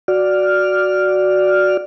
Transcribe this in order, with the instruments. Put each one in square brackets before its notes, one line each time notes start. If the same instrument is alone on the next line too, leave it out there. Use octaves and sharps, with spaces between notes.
[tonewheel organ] F#4 D5 F6